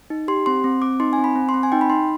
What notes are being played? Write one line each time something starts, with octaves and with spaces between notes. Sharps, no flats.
D#4
G4 C6
C4 C6
C4
C4 D6
D#4 C6
G#5
C4
B5
C4
C6
C4
G#5
D#4 G5
B5
D#4 C6